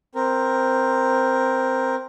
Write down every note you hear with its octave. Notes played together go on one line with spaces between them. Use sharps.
C4 A#4